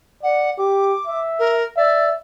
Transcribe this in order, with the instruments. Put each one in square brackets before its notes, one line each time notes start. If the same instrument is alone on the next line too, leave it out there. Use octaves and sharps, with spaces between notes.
[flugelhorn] D5 [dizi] F#5
[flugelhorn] G4 [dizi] D6
[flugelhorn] E5
[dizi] A#4
[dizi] D5 [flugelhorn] E5